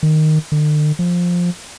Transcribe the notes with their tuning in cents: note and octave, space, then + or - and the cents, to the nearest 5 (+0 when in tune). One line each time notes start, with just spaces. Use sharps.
D#3 -5
D3 +45
F3 +10